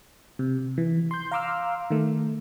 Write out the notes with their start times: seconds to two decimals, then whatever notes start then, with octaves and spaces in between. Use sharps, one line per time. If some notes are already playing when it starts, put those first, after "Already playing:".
0.39 C3
0.78 E3
1.11 C6 G6
1.31 F5 A#5 C6 D6 E6 F6
1.90 D#3 A3